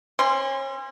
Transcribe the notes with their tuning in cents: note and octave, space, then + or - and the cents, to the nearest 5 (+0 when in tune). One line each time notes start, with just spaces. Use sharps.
C#4 -35 C6 +0